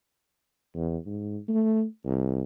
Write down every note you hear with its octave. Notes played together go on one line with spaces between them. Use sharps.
E2
G#2
A3
C2